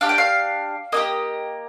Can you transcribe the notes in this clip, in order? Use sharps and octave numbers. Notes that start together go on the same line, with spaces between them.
D4 G4 F5
G5
F5
A#3 D#4 G4 D#5